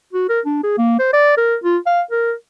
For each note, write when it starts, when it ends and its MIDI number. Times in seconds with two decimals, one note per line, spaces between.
0.13 0.26 66
0.29 0.41 70
0.46 0.60 62
0.63 0.73 68
0.78 0.97 58
0.99 1.11 72
1.14 1.36 74
1.37 1.56 70
1.64 1.78 65
1.86 2.02 77
2.11 2.33 70